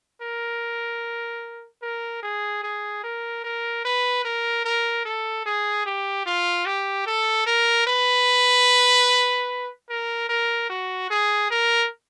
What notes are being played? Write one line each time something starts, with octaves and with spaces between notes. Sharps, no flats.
A#4
A#4
G#4
G#4
A#4
A#4
B4
A#4
A#4
A4
G#4
G4
F4
G4
A4
A#4
B4
A#4
A#4
F#4
G#4
A#4